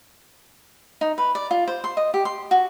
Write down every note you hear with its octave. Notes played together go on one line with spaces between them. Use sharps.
D#4
B4
D5
F4
C5
C6
D#5
G4
C6
F#4